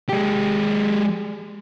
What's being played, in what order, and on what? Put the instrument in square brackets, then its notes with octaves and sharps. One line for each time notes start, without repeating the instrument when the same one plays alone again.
[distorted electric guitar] G#3 G4